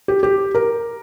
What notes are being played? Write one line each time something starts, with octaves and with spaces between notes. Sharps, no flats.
G4
G4
A#4